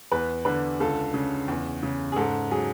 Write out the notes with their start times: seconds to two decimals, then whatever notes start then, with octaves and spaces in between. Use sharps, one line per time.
0.12 E2 B4
0.45 D3 B4
0.80 C#2 A4
1.14 C#3
1.48 E2
1.83 C#3
2.12 G#4
2.16 G#2 A4
2.51 F#3 G#4